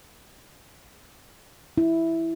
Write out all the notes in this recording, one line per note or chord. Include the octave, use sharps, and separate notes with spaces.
E4